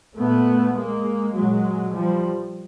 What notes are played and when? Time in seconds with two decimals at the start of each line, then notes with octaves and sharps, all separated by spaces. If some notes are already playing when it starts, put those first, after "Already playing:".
0.17 A#2 A3 B3
0.76 G#3 A#3
1.35 A#2 F#3 G#3
1.94 F3 G3